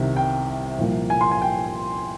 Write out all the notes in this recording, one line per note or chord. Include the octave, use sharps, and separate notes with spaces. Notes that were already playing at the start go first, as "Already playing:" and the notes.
Already playing: C2 C3 D#3
G5
C2 A#2 F3 A#3
G#5
C6
G#5
G5